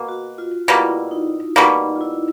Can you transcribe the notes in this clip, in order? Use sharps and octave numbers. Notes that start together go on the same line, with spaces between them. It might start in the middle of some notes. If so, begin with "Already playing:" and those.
Already playing: B2 A#3
F#4
F4
B2 G3 A#3 E4
D#4
B2 G3 A#3 D#4
F4
E4